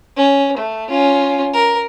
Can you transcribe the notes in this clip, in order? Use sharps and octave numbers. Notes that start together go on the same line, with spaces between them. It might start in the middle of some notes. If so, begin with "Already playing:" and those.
C#4
A3
C#4 F4
A#4